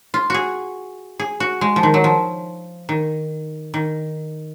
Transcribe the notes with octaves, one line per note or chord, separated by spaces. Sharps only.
F4
F#4 G#4
G#4
F#4
G#3
F3
D#3
F#3
F3
D#3
D#3